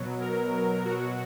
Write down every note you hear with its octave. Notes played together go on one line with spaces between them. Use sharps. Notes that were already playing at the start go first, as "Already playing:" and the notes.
Already playing: B2 F#3
A#4
F#4